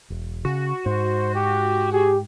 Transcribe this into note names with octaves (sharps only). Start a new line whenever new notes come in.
E1
C#3 F#4
G#2 C5
G4
G4 G#4